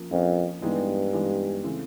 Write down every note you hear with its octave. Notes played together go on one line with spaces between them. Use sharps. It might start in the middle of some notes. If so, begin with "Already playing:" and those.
Already playing: F3 A#3 C#4
F2 F3 A#3 C#4
G2 E3 G#3 B3 D#4 G4
E3 G#3 B3 D#4 G4
C#3 E3 A3 C4